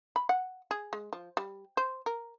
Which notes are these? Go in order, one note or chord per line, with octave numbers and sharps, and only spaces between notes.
B5
F#5
G#4
G#3
F3
G3
C5
A#4